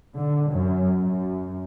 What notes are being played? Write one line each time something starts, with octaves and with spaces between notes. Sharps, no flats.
D3
F#2
F#2